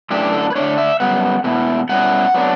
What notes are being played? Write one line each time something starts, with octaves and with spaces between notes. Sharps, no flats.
F#2 E3 A3 D4 G4
A4
B4
D3 A3 D4 C#5
E5
F#2 E3 G3 B3 F#5
E2 B2 A3 E4
B2 G3 C#4 E4 F#5
F#3 B3 D4